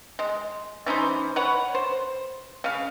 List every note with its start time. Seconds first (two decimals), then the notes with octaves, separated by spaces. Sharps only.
0.19 G#3
0.86 E3 C#4 D#4 C5
1.36 B4 C#5 F#5
1.75 C5
2.64 C#3 F5